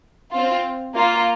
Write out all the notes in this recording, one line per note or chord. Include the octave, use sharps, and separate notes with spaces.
C4 F4
A#3 F4